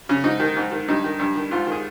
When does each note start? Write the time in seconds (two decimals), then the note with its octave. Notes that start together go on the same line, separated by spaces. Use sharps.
0.09 C#3 C#4
0.24 G#2 D#4
0.40 D#3
0.57 G#2
0.72 D#3
0.88 G2 D#4
1.04 D#3
1.19 G2
1.35 D#3
1.51 G#2 F4
1.67 D#3
1.72 G#4